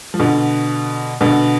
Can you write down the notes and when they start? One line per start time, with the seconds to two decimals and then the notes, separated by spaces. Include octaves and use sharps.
0.14 F3
0.19 B2 D3
1.21 B2 D3